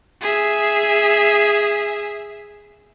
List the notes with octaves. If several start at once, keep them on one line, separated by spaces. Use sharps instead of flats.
G#4 E5